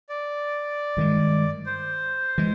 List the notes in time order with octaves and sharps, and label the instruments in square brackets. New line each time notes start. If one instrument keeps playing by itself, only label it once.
[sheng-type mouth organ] D5
[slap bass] G2 D#3 G#3
[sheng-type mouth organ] C5
[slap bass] E3 G#3